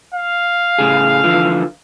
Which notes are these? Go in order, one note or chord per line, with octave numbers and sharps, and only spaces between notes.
F5
A2 C#3 G#4
D3 E3 F3